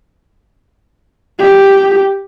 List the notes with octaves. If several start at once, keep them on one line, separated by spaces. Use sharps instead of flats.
G4